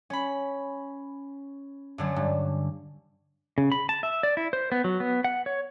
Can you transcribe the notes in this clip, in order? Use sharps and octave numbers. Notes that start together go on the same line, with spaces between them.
C#4 B5
F#2 D3 F#3
G2
C#3
B5
A5
E5
D5
E4
C5
B3
F#3
B3
F#5
C#5